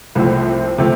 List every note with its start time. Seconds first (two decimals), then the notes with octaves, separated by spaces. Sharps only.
0.15 C2 C3 F3 A3 C4
0.78 C3 F3 A3 C4